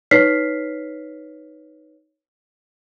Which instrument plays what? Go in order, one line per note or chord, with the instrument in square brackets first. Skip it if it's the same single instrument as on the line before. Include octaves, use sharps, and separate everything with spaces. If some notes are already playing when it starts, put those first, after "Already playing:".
[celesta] D#4 B4 C#5 F6 B6 C7